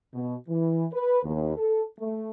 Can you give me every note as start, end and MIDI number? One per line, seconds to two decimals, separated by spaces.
0.13 0.36 47
0.48 0.84 52
0.92 1.22 71
1.24 1.53 39
1.56 1.83 69
1.98 2.30 57